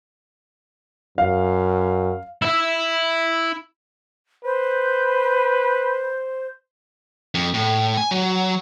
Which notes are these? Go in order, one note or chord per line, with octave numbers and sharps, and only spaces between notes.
F#2 F5
E4 E5
B4 C5
F2
A2
G#5
F#3